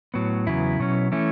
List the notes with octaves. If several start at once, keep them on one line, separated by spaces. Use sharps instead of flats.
A2 F#3 B3
E2 C#3 F#3 B3 E4
B2 F#3 C#4
E3 A3 C#4 E4